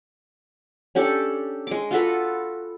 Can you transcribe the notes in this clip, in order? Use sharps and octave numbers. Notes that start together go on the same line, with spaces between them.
C#4 D4 G4 A4
G#3 D6
F4 F#4 A4 B4